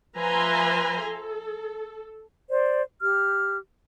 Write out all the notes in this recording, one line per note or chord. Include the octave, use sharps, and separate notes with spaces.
F3 B4 E5 G#5 A#5 C6
A4
C5 D5
G4 F6